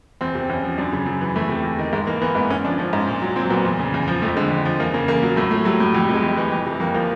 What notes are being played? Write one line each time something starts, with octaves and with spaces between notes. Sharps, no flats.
E2 C4
C3
E2 C#4
F3
F#2 D4
C#3
F#2
E3
E2 A3
C3
E2
D#3
G#2 G#3
E3 A#3
E3 B3
G#2 B3
G#2 C#4
F3 D4
F3 C#4
G#2
A#2
F#3
F#3 C4
A#2 B3
E2
C#3
E2
F3
F2 A3
D3 G#3
F2
F3
E2 A#3
C#3 A#3
E2 A#3
F#3
A2 A3
F#3 A3
F#3 G3
A2
F2 F#3
G3
C3 G#3
F2
E3
F2
C3
F2 A#3
F3 A#3